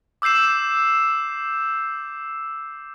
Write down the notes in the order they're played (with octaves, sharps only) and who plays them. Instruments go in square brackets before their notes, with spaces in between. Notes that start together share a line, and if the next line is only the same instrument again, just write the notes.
[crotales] D6 E6 G6 C7 E7